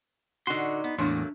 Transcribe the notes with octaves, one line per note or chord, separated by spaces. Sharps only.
D3 D#4 F#4 C6
B3
E2 A2 F#3 A3 A#3 D4 C6